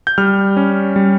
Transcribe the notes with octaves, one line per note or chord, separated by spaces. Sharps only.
G6
G3 F6
C#4
G3